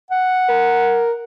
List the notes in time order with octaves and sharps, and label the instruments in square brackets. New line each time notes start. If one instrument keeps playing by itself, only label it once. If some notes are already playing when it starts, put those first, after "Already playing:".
[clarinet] F#5
[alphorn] A#4